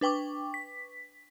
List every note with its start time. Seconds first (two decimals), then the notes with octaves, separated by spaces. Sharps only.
0.01 D4 B4 G5 C#6 D6
0.54 B6